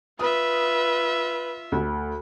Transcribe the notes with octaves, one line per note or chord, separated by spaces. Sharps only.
F4 B4 E5 D#6
D2